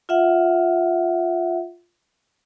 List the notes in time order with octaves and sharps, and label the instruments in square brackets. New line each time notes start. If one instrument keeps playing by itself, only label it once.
[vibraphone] F4 E5 F#5